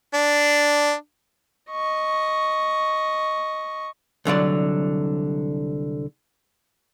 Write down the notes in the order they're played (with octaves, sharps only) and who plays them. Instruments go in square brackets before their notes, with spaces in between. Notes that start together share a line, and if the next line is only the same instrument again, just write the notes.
[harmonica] D4
[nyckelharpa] D#5 C#6
[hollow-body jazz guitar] C2 D3 F#3 D5